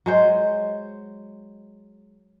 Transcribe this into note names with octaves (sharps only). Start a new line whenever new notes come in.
F#3 G#3 C5